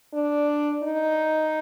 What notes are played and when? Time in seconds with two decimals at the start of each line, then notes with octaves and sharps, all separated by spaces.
0.14 D4
0.83 D#4